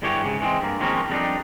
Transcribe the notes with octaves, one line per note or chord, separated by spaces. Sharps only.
E2 G2 D3 E3 G4 C#5
G#2 C#3
E3 G#3 C4
G2 A#3
D#3 F3 G#3 A#3 C4 C#4
F2 G3 G#3 B3 D4 D#4